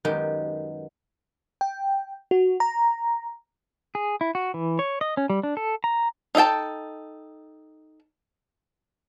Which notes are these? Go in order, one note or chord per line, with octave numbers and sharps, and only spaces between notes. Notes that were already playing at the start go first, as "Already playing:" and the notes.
F#2 D#3 G#3 B3 G4
G5
F#4
A#5
G#4
E4
F#4
E3
C#5
D#5
C#4
G3
D4
A4
A#5
D#4 A4 D#5 G5 A5